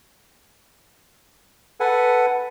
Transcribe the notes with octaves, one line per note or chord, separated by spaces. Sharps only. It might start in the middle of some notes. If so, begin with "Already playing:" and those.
A4 B4 F#5 G#5